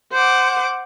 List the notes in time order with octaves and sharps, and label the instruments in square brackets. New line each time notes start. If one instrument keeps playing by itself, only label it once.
[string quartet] C5 F#5 D6